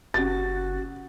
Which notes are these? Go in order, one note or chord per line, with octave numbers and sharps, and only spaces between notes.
F#1 C#4 F#4 G4 A6